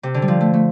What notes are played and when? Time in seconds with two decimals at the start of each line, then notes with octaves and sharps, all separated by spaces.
0.03 C3
0.14 D3
0.22 G3
0.28 F3
0.41 A3
0.54 A3